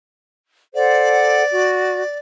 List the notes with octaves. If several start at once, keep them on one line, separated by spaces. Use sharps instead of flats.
A4 C5 D5 F#5
F#4